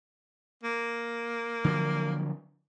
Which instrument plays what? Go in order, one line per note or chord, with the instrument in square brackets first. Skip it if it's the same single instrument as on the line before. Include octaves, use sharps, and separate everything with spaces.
[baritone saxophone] A#3
[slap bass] D3 F3 F#3